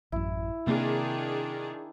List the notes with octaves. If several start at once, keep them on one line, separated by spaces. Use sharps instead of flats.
A1 F#2 E4
C3 D#3 A#3 C4 D4 G#4